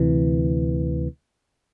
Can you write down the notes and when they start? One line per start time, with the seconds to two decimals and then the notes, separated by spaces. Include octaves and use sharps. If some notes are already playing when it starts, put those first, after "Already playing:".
Already playing: D2 C3 E3